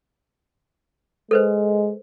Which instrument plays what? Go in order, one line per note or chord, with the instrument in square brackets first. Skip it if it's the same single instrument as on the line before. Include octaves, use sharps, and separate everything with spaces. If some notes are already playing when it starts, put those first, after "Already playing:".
[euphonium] G#3 [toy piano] A4 B4 C5